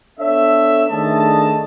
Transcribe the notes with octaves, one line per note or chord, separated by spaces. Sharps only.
B3 D4 A4 C#5 E5
D#3 A3 D4 G#4 D#5 A5